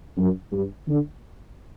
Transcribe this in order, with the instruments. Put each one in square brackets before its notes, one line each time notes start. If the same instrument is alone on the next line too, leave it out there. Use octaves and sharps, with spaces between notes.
[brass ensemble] F#2
G2
D3